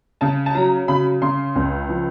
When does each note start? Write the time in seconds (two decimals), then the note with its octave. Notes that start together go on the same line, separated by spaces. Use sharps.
0.21 C#3 A5
0.46 A5
0.55 F#3 A#5
0.88 C#3 B5
1.22 C#3 C6
1.55 C#2
1.89 F3